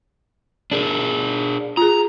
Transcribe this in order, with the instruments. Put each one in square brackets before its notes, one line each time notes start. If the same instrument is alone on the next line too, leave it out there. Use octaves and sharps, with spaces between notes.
[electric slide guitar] D4 G#4 A#4
[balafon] F4 G#4 [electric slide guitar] A#5